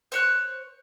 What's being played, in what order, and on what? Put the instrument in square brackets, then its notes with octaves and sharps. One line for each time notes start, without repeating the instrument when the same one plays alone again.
[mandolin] C5 C#5 F#6